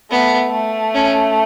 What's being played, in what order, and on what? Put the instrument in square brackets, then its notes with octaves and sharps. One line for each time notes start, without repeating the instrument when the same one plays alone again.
[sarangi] A3 [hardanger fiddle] B3
[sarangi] A3
[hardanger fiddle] C#4